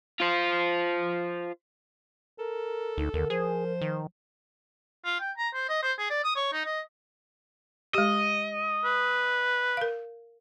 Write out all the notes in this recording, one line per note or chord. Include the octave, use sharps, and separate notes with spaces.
F4 C5
A4 A#4
D2 D#4
D#2 D3 A#4
F3 G#4 C5
D#3
F4
G5
A#5
C5
D#5
C5
G#4
D5
D#6
C#5
D#4
D#5
G#3 G4 D#5
B4
A#4 F5